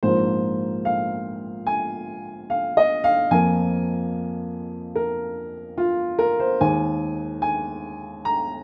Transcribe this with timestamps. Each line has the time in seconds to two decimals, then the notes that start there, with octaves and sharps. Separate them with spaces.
0.03 A#1 G#2 F3 A#3 C5
0.85 F5
1.67 G#5
2.50 F5
2.77 D#5
3.04 F5
3.31 F2 F3 A#3 G#5
4.96 A#4
5.78 F4
6.19 A#4
6.40 C5
6.60 D#2 D#3 G#3 G#5
7.42 G#5
8.25 A#5